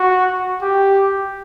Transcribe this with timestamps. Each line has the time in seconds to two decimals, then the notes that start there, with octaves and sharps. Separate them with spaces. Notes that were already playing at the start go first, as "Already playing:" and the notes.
Already playing: F#4
0.62 G4